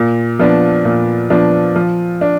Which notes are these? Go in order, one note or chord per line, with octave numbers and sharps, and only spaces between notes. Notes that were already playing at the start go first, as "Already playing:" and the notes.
Already playing: A#2
F3 B3 D4
A#2
F3 B3 D4
F3
D4